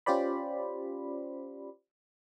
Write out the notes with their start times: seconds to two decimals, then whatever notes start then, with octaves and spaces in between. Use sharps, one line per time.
0.06 C#4 F4 G4 C5 D5 B5